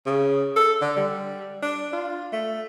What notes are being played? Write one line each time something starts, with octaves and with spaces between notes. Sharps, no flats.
C#3
A4
D3
G3
D4
F4
A3